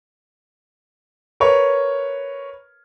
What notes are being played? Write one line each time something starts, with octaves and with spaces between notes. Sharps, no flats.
A#4 B4 C#5